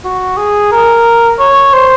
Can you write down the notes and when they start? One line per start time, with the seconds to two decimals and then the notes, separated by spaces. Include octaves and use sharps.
0.04 F#4
0.37 G#4
0.72 A#4
1.39 C#5
1.73 C5